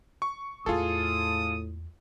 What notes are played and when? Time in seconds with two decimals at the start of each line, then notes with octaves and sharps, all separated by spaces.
0.22 C#6
0.66 E2 A2 G#3 F4 G#4 A4 D#6